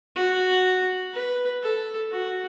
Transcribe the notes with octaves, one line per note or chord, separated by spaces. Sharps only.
F#4
B4
A4
F#4